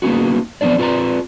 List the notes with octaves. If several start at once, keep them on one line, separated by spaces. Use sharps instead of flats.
A#3 B3 C#4 D#4 F#4
F3 B3 C4 D4 D5
C4 F4 A4 B4 D5 A#5